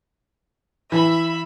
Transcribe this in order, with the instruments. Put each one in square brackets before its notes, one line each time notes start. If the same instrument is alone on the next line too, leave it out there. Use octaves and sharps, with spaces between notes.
[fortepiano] E3 [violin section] E5 B5